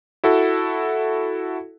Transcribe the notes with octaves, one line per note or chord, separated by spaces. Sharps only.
E4 F#4 A4